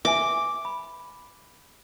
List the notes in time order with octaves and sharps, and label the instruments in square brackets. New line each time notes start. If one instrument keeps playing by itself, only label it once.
[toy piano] B4 E5 G#5 [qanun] D6
[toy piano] B5